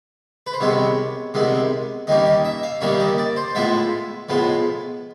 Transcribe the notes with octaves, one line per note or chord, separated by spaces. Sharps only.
B4
C5
C2 C3 D#3 G#3 B3 C#5
C2 C3 D#3 G#3 B3
D#2 D#3 G3 A#3 C#4 D#5
D#5
E5
F5
D#2 D#3 G3 A#3 C#4 E5
D#5
D5
C5
A2 F3 G#3 B3 E5
A2 F3 G#3 B3